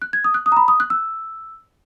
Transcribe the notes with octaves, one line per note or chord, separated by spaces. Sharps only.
F#6
G#6
D#6
F#6
D#6
A#5
B5
D#6
F#6
E6